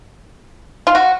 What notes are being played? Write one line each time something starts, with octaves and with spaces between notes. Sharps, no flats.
F4
F#4